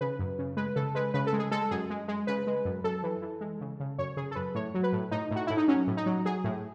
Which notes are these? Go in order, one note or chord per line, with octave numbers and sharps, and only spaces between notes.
C#3 B4
F#2
C#3
G#3 B4
C#3 A4
G#3 B4
C#3 B4
A4
G#3
G#4
G#3 A4
F#2 G#4
G#3
G#3
C#3 B4
G#3
F#2
F#2 A4
E3
E3
G#3
C#3
C#3
F#2 C#5
C#3 G#4
A4
F#2 B4
A2 C#5
F#3
B4
A2
A2 D#4
A2 F#4
A2 E4
D#4
F#3 C#4
A2
D#4
F#3
F#3 G#4
A2